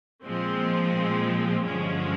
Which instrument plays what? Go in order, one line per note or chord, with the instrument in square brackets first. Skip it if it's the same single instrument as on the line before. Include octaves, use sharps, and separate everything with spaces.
[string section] A#2 F3 G#3 C4
G2 D3 F3 G#3 C#4